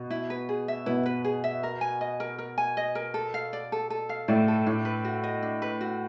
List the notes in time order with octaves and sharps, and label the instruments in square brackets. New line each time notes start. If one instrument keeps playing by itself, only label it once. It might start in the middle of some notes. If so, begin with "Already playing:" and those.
Already playing: [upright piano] B2 B3
[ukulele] E4
B4
G#4
E5
[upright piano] B2 B3 [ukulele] E4
[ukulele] B4
G#4
E5
A#4
G#5
D#5
A#4
A#4
G#5
D#5
A#4
A4
F5
D5
A4
A4
F5
[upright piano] A2 A3 [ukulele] D5
[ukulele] A4
[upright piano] A2 A3 [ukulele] D4
[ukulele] B4
F#4
D#5
D4
B4
F#4